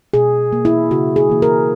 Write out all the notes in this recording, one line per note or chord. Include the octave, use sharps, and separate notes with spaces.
B2 G#4
A#3
E4
C#3 F#4
G#4
E3 A#3
A#4